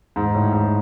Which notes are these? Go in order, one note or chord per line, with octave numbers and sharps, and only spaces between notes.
G#2
A2
G#2